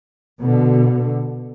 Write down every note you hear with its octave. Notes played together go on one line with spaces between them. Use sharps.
B2 D3